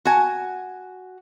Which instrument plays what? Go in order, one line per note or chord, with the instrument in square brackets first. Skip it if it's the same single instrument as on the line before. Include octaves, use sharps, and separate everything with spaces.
[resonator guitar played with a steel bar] F#4 G#5